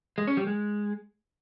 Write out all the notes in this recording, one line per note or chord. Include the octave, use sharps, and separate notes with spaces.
G#3
C#4
G3
G#3